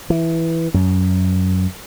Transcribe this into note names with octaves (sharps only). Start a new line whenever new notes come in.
E3
F#2